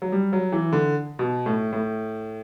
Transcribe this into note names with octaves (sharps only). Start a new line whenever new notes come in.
F#3
G3
F#3
E3
D3
B2
A2
A2